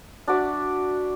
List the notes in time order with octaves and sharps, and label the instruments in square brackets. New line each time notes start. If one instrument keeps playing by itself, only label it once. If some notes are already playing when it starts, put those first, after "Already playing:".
[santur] D4 F#4 D5 E5